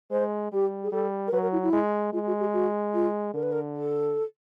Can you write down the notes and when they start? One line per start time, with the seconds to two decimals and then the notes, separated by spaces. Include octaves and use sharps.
0.11 G#3 C5
0.52 G3 G4
0.84 G#4
0.92 G3 A4
1.28 A#4
1.32 F#3 B4
1.42 A#4
1.52 E4
1.63 E4
1.73 G#3
2.13 G#3 F4
2.27 F#4
2.40 G4
2.54 F#4
2.94 F4
3.34 D3 A#4
3.43 B4
3.52 A#4
3.75 A4